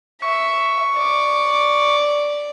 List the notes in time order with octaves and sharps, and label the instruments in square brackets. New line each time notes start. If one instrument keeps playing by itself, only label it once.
[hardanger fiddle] E5 [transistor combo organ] C#6
[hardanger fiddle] D5